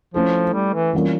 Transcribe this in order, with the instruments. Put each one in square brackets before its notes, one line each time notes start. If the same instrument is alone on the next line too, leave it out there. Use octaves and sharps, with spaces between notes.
[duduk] F3 [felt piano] A3 C#4 E4 A4
[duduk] G3
E3
[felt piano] E3 G3 A#3 C#4 F4